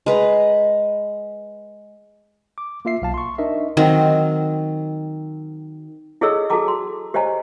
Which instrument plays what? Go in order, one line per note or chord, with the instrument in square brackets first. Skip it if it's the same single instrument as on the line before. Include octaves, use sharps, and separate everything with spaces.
[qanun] G#3 B4 A#5
[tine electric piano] D6
A#3 F4 E5 C7
B1 F5 A5
C6 C#6
D4 D#4 A#4 D#5 E5
[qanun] D#3 F#3 C4
[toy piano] E4 G#4 A4 C#5 D#5 E6
F#4 G#4 A4 A5 A#5 D6
C6
G4 C5 C#5 D#5 G#5 A#5